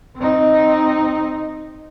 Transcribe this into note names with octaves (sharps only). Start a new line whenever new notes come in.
C4 D#4